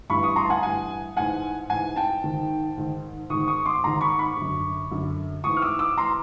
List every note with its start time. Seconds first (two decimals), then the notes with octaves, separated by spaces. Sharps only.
0.09 G2 E3 B5 C#6
0.23 C#6 D#6
0.36 A#5 C6
0.46 A5
0.50 F#5 G#5
0.63 G2 E3 F#5 G#5
1.17 G#2 E3 F#5 G#5
1.70 G#2 E3 F#5 G#5
1.96 G5 A5
2.24 G#2 D#3
2.77 G#2 D#3
3.30 G#2 D#3 C#6 D#6
3.48 C#6 D#6
3.66 C6 D6
3.84 G#2 D#3 A#5 C6
4.01 B5 C#6
4.19 B5 C#6
4.37 F#2 D3
4.91 F#2 D3
5.44 G#2 E3 C#6 D#6
5.57 F6
5.62 D6 E6
5.79 D6 E6
5.97 E3 A#5 C6